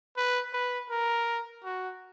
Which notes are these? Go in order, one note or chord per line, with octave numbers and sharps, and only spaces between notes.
B4
B4
A#4
F#4